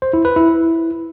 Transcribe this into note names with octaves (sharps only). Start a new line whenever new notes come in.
C5
E4
B4
E4